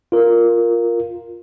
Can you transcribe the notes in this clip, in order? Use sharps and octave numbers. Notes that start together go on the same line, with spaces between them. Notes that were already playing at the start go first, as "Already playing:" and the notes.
F4 A#4